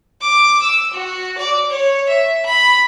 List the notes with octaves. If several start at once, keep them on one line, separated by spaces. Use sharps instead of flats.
D6
E6
F#4
D5
C#5
E5
B5